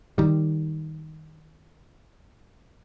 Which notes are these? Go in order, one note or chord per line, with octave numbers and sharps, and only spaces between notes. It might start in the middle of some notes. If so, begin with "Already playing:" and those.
D#3 G3